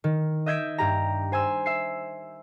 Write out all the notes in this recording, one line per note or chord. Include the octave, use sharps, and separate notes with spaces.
D#3
D#5 E5 G6 G#6 B6 D7
G2 G4 A#5
C5 G#5 C6 E6
E5 C7